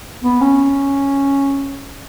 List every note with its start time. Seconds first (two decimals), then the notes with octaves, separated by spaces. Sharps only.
0.24 B3
0.41 C#4